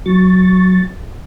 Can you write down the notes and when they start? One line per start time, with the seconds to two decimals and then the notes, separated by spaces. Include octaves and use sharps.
0.06 F#3 C#6 A6